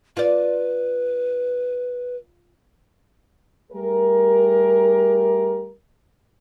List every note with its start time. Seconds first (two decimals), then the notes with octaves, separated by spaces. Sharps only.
0.17 F4 B4 D5
3.72 G3 A3 G4 G#4 A#4